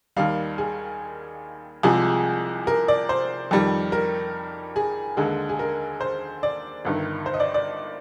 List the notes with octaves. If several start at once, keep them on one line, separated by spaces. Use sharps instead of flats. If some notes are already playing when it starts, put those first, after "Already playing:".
D#2 D#3 G3 F5
G#4
C2 C3 F3 G#3 G#4
A#4
D5
C5
F2 D#3 G3
A#4
G#4
D#2 D3 G#3
G#4
A#4
C5
D5
G1 G2 D#3
C5
D#5
D5
D5